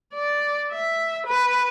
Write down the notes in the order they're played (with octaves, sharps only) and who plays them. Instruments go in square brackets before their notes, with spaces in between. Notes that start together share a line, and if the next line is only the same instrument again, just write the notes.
[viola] D5
E5
B4